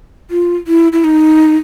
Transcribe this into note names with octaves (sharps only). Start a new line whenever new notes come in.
F4
E4
E4
D#4